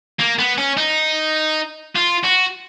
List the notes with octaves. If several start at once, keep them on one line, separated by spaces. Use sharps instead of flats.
A#3
B3
C#4
D#4
F4
F#4